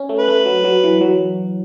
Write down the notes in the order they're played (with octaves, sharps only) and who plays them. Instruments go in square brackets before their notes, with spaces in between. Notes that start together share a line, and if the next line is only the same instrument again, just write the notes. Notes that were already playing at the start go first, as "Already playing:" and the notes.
Already playing: [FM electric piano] C#4
A3
[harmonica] B4
[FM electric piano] A3
F#3
F#3
E3
F#3